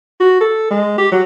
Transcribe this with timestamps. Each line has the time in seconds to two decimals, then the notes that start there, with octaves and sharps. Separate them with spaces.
0.20 F#4
0.41 A4
0.70 G#3
0.98 G4
1.12 F#3